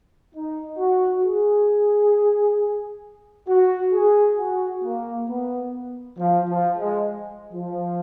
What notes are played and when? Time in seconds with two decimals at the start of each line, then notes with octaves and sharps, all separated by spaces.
0.35 D#4
0.78 F#4
1.24 G#4
3.48 F#4
3.93 G#4
4.38 F#4
4.83 A#3
5.28 B3
6.18 F3
6.48 F3
6.77 G#3
7.52 F3